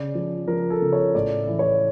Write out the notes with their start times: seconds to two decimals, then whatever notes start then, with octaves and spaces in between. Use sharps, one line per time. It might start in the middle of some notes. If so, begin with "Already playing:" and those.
Already playing: C#3 D5
0.15 F3
0.48 F3 A#4
0.70 A4
0.82 C#3
0.93 C#5
1.15 A2 D5
1.47 E3
1.59 C#5